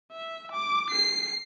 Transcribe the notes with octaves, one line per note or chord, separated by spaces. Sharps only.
E5
D6
C7